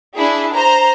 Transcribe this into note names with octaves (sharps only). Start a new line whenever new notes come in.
D4 E4 G#4
C5 A#5